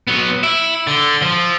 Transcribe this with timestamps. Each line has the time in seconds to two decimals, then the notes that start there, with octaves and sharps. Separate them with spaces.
0.07 F#3 B3 C#7
0.43 E4 E6 D7
0.87 D3 A6 G7
1.22 F3